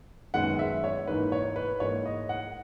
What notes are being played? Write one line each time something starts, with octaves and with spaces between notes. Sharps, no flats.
F#2 D#3 G#3 B3 F#5
E5
C#5
G#2 E3 A#3 D#4 B4
C#5
B4
G#2 E3 A#3 D#4 C#5
D#5
F#5